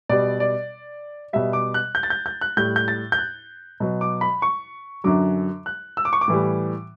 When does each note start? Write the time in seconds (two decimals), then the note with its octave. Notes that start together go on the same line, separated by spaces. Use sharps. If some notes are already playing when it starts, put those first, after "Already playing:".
0.09 B2 G3 D5
0.40 D5
1.33 B2 G3 E5
1.53 D6
1.74 F#6
1.95 G6
2.03 A6
2.10 G6
2.26 G6
2.41 F#6
2.57 A2 G3 G6
2.76 G6
2.88 A6
3.12 G6
3.18 F#6
3.80 B2 F#3
4.01 D6
4.21 B5
4.42 C#6
5.04 F#2 D3 F#3 D6
5.66 F#6
5.97 E6
6.05 D6
6.13 C#6
6.21 D6
6.28 A2 E3 G3